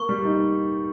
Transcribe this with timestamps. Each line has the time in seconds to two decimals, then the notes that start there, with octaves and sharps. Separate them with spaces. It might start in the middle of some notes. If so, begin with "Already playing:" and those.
Already playing: A#3 C#6
0.09 G3
0.25 D#4